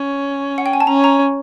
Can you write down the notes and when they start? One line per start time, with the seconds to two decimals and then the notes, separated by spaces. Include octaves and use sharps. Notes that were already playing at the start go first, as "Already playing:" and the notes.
Already playing: C#4
0.58 F#5
0.66 G5
0.73 G#5
0.80 A5
0.87 C#4 A#5
1.04 A#5